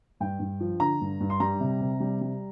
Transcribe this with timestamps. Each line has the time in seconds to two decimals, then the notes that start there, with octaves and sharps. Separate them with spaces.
0.20 G2 G5
0.40 G2
0.60 F3
0.80 D3 A#5
1.01 G2
1.21 G2
1.30 C6
1.40 G3 A#5
1.60 C3
1.81 C3
2.00 G3
2.21 G3